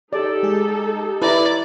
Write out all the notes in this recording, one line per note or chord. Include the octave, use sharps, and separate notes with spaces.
D#4 G4 A4 D5
G#3 G#4
E4 B4 D5 A#5